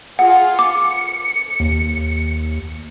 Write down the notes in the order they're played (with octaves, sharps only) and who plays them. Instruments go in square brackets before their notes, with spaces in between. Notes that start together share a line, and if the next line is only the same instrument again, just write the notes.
[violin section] F4 G#4 [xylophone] F#5
[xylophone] D6 [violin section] C#7
[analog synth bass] D#2